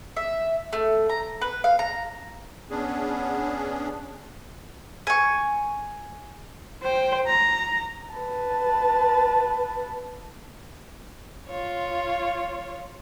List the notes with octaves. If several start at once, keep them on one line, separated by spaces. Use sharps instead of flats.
E5
A3
A#5
B4
F5
A#5
B3 C#4 D4 G#4
G#5 C#6
C5 G5
A#5
B4 A5
F4 C#5